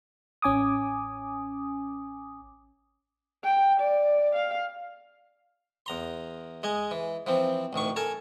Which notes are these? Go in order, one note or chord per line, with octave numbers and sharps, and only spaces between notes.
A1 C#4 G#5 D6 D#6
G5
D5
F5
E2 A#5 C6
G#3 D#5 G#5
E3
E3 F3 C4
A1 D2 D#3 C#6
A4 A#4 G#5 A5